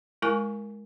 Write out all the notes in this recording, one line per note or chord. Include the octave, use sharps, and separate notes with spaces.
G#3 E4 A#4 G#5 C#6